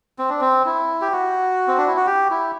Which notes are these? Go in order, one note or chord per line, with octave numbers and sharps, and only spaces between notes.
C4
D4
C4
E4
G4
F#4
C4
D4
E4
F#4
G4
E4